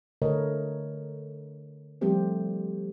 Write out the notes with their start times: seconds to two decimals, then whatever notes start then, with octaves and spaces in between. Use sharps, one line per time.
0.22 D3 A3 A#4 B4 C#5 D#5
2.01 F3 G3 A3 C4 G4 C5